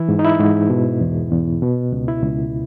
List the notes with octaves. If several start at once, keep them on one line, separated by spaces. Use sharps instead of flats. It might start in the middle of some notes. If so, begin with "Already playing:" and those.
Already playing: E3 E4
G#2
D#4
E4
G#2
B2
E2
E2
B2
C#2
E4
C#2